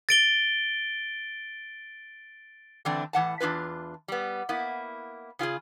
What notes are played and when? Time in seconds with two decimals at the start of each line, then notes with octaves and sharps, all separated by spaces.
0.09 A6 D7 G7
2.85 D3 E3 A3 C4 D4
3.13 A2 E3 F#5 A5
3.40 E2 D4 F4 B4
4.08 G3 B3
4.49 A#3 B3 E4
5.39 C#3 F4 G4 G#4